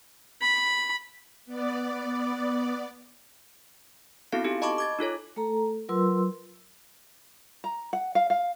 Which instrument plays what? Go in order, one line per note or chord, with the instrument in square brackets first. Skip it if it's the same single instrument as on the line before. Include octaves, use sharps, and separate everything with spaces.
[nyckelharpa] B5
[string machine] B3 D5
[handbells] B3 C4 E4 F#4 A4 F5
D#4 G4 A4
D#5 A5 B5 C#6 D6
D6 G#6 A6
D#4 F4 A4 C#5
[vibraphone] A3 A4 A#5
F#3 F4 A#4 B4 C6 E6
[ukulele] A#5
F#5
F5
F5